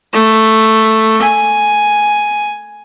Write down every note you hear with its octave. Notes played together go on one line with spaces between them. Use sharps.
A3
G#5